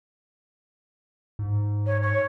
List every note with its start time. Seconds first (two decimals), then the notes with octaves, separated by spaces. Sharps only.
1.39 G#2
1.87 C#5
2.03 C#5